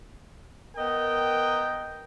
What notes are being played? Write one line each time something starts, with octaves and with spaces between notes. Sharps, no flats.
B3 A#4 D#5 G5